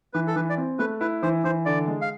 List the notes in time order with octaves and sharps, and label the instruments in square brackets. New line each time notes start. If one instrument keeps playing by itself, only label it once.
[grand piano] E3 [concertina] B4
[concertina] A4
[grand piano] E3 [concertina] B4
[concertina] D5
[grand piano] C4
[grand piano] A3 [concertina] B4
[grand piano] E4 [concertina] B4
[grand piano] E3 [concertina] C5
[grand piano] E3 [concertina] C5
[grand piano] D3 [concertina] D5
[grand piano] G#3
[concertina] F5